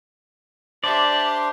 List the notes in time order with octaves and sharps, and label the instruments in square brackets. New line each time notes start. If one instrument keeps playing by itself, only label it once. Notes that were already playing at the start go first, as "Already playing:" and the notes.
[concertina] D4 C5 C6 [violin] G4 E5 [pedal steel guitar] D5